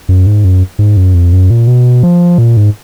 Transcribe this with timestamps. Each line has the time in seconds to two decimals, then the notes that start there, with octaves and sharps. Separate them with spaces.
0.09 F#2
0.27 G#2
0.44 F#2
0.79 G#2
0.97 F#2
1.14 F2
1.33 F#2
1.50 A#2
1.67 B2
2.03 F3
2.38 A#2
2.57 G#2